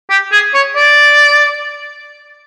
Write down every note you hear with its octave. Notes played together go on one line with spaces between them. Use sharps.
G4
G#4
C#5
D5